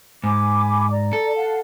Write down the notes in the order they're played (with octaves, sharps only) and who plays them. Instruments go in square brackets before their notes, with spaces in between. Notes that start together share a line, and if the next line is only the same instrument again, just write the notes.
[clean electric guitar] G#2 [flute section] G#5 B5 D6
[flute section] D5 A#5
[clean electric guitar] A4
[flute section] F5 F#5 A5